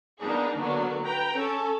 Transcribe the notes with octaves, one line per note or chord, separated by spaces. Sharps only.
A#3 B3 D4 D#4 G#4
D3 F#3 A#3 B3 D4
B4 G5 A#5
C#4 A4